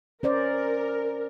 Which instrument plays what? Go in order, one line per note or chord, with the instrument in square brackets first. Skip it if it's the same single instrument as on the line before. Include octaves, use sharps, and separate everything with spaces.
[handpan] C#4 C5 D5 [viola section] A#4